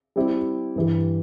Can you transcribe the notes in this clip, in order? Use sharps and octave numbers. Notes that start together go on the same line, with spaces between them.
G3 C4 E4 G4
G2 E3 G3